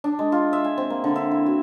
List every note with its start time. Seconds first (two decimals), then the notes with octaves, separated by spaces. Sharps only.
0.04 D4
0.19 G#3
0.32 F4
0.53 E5
0.64 G#5
0.78 C4
0.90 A#3
1.04 D3
1.16 E5
1.31 E4
1.46 F#4